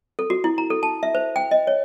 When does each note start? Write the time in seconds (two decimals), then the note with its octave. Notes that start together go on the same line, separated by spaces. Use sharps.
0.19 A4
0.30 F#4
0.44 E4
0.58 A#5
0.70 A4
0.83 A5
1.03 E5
1.15 C5
1.36 G5
1.51 D#5
1.67 C#5